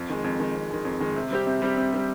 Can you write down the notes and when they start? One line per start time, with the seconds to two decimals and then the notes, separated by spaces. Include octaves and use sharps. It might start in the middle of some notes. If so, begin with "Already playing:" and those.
Already playing: F2
0.10 D#3 G#3
0.24 F2
0.40 D#3 G#3
0.55 F2
0.70 D#3 G#3
0.85 F2
1.00 D#3 G#3
1.16 C3
1.31 G3 C4 G4
1.47 C3
1.62 G3 C4 G4
1.77 C3
1.93 G3 C4 G4